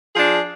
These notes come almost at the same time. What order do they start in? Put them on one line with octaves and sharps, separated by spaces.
G#4 F3 D4